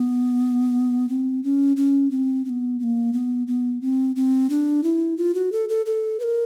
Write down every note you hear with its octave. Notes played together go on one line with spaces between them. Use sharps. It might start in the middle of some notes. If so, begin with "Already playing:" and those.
Already playing: B3
C4
C#4
C#4
C4
C4
B3
B3
A#3
B3
B3
C4
C4
D4
E4
F4
F#4
A4
A4
A4
B4
A#4